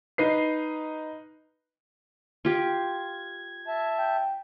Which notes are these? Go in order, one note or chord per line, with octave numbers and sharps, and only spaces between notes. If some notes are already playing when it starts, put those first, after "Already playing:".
D#4 B4 C7
F4 G4 G#6
E5 A5
G5